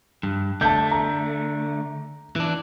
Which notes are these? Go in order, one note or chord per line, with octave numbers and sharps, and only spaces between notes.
G2
D3 A3 A5 G6
A#5
E3 D4